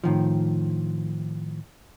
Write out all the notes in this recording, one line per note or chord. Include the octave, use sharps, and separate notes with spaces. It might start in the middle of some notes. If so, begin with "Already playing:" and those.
A2 D#3 F3